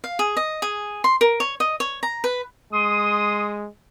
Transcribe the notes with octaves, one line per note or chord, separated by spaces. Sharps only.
F5
G#4
D#5
G#4
C6
A#4
C#5
D#5
C#5
A#5
B4
G#3 C6 D#6